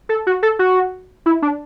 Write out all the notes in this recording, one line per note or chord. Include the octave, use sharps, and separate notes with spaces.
A4
F#4
A4
F#4
E4
D4